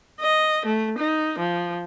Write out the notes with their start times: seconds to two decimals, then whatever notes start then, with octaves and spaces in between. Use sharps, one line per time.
0.21 D#5
0.66 A3
0.98 D#4
1.39 F3